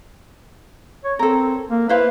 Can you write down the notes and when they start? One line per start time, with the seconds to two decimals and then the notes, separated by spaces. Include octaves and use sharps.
1.05 C#5
1.19 C4 A4 A#4
1.70 A#3
1.89 E4 B4 C5 F5